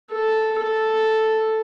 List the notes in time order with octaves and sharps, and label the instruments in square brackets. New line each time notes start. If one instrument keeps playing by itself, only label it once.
[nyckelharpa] A4
A4